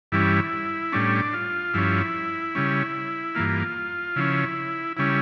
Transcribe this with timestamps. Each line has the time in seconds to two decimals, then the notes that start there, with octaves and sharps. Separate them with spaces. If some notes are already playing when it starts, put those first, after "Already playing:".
0.12 G2 E3 G3 C#4 E4
0.92 A2 G3 C#4 D4
1.33 F4
1.74 G2 F3 C#4 E4
2.55 C#3 G3 C#4
3.35 G2 E3 A#3 F4
4.16 C#3 F3 C#4 E4
4.97 C#3 G3 C#4 E4